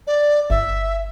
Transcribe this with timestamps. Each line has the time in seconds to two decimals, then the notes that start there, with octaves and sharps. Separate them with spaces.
0.07 D5
0.50 G1 E5